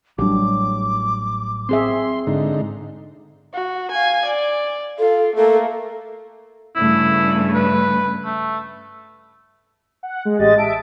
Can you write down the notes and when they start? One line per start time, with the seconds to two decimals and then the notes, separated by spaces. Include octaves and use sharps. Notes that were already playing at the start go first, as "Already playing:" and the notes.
0.18 A1 F#3 G3 D4 G4 D6
1.69 C4 G#4 E5 C6
2.27 G#2 D3 D#4
3.54 F#4
3.91 F5 G#5
4.25 D5
4.99 F4 A4
5.36 A3 A#3 A4
6.76 G2 C#3 A3 E4
7.55 B4
8.25 A3
10.03 F#5
10.25 G#3
10.39 A1 G#3 G4 D#5 A6
10.58 E5 A5 D7